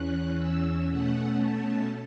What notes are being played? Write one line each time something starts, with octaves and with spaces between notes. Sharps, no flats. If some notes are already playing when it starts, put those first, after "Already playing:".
Already playing: E2 E3 C#4 F#6
E6
B2 A3 C#4 F#5
A5